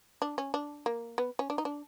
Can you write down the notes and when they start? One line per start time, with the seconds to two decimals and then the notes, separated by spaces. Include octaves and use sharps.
0.22 D4
0.38 C#4
0.54 D4
0.86 A#3
1.18 B3
1.39 C#4
1.50 D4
1.58 D#4
1.65 D4